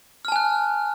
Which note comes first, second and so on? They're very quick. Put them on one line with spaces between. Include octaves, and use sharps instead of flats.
F6 A5 G#5 F#6